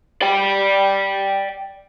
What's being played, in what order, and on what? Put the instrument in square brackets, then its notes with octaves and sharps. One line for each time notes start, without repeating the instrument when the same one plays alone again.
[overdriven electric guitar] D5 G5